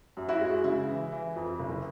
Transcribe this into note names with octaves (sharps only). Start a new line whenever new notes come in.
F#2
E4 F#4
G#3
C#3 E4
E3
E3
F2
F#1